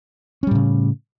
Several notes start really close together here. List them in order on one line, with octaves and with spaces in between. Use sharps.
C#4 G3 A2 C#3